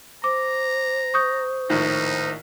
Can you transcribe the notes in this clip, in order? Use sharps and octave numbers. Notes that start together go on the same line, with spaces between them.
C5 A#5 D6
C#6 D#6 G6
A#1 A2 D#3 D#4